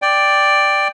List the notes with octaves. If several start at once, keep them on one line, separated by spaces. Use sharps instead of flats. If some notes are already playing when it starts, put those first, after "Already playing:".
D5 G5